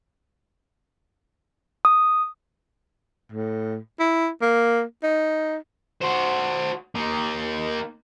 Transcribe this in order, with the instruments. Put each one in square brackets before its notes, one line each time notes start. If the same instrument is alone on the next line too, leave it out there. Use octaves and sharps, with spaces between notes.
[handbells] D#6
[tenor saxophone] A2
E4
A#3
D#4
[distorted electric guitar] F#4 C5
A#3 D#4